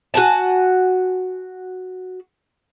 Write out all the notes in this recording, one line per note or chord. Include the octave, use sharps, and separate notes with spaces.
F#4 F#5 G#5 A5